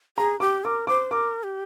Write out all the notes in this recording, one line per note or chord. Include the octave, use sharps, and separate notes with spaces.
G#4 A#5
G4 D6
A#4 D6
C5 D6
A#4 D6
G4